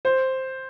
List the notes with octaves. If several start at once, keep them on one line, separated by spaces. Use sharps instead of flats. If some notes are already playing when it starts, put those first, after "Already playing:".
C5